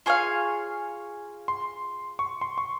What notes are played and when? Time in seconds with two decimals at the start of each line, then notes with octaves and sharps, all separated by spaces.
0.06 F4 G#4 C#5 F5
1.48 C6
2.19 C#6
2.41 C6
2.58 C#6